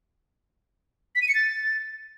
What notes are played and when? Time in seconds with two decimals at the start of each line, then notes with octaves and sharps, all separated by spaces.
1.15 B6
1.22 D#7
1.28 C#7
1.35 A6